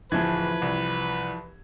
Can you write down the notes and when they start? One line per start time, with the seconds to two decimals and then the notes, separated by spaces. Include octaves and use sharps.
0.12 D1 E3 F3 E4 B4 G#6
0.62 C2